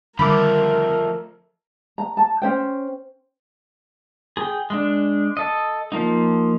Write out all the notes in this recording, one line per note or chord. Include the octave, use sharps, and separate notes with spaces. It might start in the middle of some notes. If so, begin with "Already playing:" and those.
D3 D#3 F3 G3 A3 A#4 B5 D6
A#5
A5
C#4 C5 G5
G#4 G5
G#3 D4
A4 D#5
F3 A#3 D#4